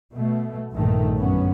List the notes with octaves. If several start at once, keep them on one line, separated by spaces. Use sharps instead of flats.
B2 A3
A#1 G2 A#2 D#3 A3
G1 F#2 B3 C#4